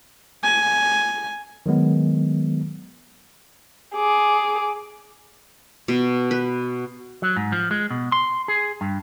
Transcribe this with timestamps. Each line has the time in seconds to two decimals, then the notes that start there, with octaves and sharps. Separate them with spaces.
0.44 G#5
1.66 D#3 F#3 G#3 B3
3.96 G#4 D6
5.88 B2
6.31 B4
7.22 F#3
7.37 G#2
7.52 F3
7.71 G#3
7.90 B2
8.12 C6
8.48 G#4
8.81 G2